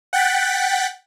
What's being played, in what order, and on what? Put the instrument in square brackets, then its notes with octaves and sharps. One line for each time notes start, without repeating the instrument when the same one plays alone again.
[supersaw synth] F#5 G5 F#6 A6 B6